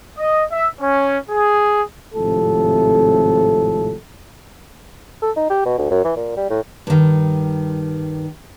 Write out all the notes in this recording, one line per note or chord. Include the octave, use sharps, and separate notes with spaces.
D#5
E5
C#4
G#4
G#1 A2 C3 F3 A4
A4
D#4
G4
B2
D2
F#2
E3
A#2
G3
A2
G2 D#3